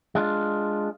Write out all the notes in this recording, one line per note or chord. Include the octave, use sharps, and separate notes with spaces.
G#3 D4 F4